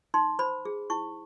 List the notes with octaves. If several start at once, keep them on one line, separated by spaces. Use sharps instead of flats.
D#4 C6
C5 B5
G#4
E4 C#6